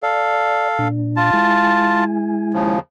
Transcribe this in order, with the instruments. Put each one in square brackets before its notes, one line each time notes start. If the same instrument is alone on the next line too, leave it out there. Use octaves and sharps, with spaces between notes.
[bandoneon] A4 F5 [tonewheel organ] D5
[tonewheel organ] A#2 D4
[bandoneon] F4 A5
[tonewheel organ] G#3 E4 G#5
[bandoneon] D#2 C#3 F3